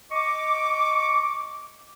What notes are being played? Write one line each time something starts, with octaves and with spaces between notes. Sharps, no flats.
D#5 C#6 D6